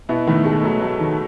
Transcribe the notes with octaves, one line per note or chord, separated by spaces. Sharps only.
B2 B3 E4
A2 D#3 A3
G#3 A3
F#3 A3
F#3 A3
D#3